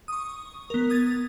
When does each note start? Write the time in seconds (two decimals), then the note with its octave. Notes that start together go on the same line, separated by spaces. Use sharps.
0.08 C#6 D#6
0.70 B3 A#4
0.90 D#6 G#6 A6